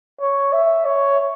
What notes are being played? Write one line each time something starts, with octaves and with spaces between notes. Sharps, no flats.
C#5
E5
C#5